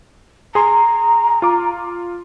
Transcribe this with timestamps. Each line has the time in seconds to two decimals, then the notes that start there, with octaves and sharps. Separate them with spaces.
0.55 G#4 A#5 C6
1.42 F4 D6